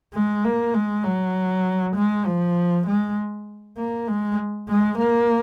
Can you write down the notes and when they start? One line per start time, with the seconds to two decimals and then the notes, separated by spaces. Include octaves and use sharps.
0.14 G#3
0.44 A#3
0.74 G#3
1.04 F#3
1.96 G#3
2.26 F3
2.87 G#3
3.77 A#3
4.08 G#3
4.69 G#3
4.98 A#3